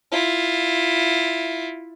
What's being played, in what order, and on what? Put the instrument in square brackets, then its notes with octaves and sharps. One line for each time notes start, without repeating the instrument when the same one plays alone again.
[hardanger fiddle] E4 F4